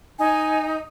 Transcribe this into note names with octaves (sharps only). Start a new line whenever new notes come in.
D#4 G#5